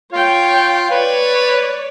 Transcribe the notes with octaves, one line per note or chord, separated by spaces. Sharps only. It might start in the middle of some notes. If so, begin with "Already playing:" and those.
F4 C#5 G5
B4 C#5 D5